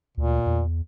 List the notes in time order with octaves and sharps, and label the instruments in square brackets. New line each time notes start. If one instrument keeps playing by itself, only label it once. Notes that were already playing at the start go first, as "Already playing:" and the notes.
[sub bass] D2 [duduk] A#2
[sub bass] E2